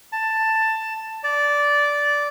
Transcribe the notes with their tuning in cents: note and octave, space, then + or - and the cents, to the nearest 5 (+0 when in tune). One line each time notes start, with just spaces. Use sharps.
A5 +10
D5 -10